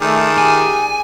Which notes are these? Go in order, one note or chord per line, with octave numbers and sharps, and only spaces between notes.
D#3 A3 G#4 D5
G4 G#5